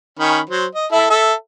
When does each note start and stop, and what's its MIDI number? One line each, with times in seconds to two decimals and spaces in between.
0.19 0.40 51
0.19 0.40 61
0.19 0.40 83
0.50 0.66 54
0.50 0.66 72
0.75 0.87 75
0.92 1.06 64
0.92 1.06 69
0.92 1.06 76
1.10 1.33 69
1.10 1.33 76